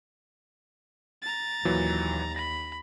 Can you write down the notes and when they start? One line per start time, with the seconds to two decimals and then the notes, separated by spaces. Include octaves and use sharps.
1.22 A#5 A6
1.65 D#2 A#2 E3 F#3
2.36 B5 A#6